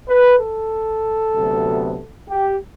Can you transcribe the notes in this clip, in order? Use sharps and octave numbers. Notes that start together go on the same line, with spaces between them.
B4
A4
D2 C3 F#3 B3
G4